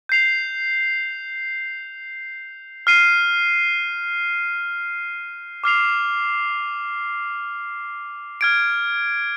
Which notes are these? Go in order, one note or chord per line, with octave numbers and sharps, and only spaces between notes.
G6 C7 F7
F6 C7 D#7
D6 F6 C7 F7
F6 G#6 D7